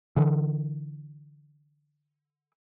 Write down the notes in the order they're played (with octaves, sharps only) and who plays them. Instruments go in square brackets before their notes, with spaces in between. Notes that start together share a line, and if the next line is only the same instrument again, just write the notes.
[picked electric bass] D3 E3